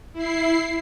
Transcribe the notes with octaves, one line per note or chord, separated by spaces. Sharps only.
E4 C7